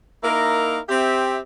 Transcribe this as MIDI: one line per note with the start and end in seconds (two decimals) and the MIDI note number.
0.24 0.78 58
0.24 0.78 63
0.24 0.78 64
0.24 0.78 70
0.89 1.39 60
0.89 1.39 67
0.89 1.39 76